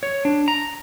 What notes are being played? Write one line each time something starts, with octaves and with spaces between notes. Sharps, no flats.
C#5
D4
A#5